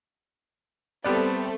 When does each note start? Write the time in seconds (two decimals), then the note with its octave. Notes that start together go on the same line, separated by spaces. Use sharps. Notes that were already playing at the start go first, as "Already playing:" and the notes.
1.04 G3 A3 B3 C4 A4 D5